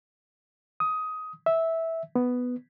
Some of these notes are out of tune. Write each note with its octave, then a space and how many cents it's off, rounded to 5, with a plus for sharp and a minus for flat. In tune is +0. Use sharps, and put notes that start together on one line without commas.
D#6 +15
E5 -10
B3 +5